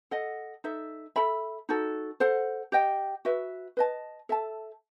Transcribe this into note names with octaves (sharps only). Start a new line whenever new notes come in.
A4 D#5 F#5
D#4 A4 E5
A4 E5 B5
D#4 F#4 A4
A4 C5 F#5
G4 D#5 G5
F#4 B4 E5
B4 D#5 A5
A4 E5 A5